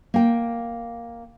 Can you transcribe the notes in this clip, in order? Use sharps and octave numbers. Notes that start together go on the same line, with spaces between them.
A#3 G5